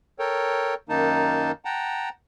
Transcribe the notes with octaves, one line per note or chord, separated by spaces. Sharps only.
A4 A#4 C#5 G5
F#2 D#3 A#3 D#4 A5
F#5 G5 A5 A#5